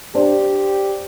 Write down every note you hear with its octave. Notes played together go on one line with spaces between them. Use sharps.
D4 G4 C5